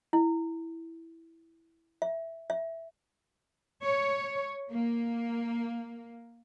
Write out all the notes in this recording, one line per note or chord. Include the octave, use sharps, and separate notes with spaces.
E4
E5
E5
C#5
A#3